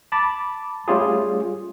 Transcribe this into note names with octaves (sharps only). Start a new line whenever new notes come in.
A5 B5 D6 A6
G3 A3 C#4 F4 G4 G#4